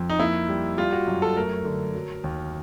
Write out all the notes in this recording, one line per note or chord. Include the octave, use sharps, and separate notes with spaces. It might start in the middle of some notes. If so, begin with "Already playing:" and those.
Already playing: F2
D#4
A#3 E4
G3
G3 F4
F#4
F#2
A4
A3 A#4
D3
F#3
D#2